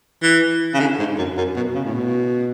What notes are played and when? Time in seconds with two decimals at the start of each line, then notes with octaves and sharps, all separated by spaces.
0.22 E3
0.74 C#3
0.80 D3
0.99 G#2
1.18 F#2
1.37 F#2
1.56 B2
1.74 C#3
1.84 A2
1.94 B2